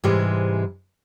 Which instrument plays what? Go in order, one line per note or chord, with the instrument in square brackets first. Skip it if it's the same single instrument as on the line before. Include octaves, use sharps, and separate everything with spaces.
[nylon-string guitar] G#2 C3 E3 G3 G#3